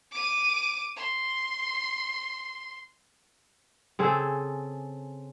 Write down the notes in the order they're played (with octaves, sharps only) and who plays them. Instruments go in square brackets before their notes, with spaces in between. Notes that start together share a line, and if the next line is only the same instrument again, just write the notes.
[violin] D6 D#7
C6
[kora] C#3 C4 G#4 A4